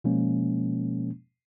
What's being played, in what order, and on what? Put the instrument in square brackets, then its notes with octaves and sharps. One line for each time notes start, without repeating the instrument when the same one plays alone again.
[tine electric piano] B2 F3 G#3 A#3 C#4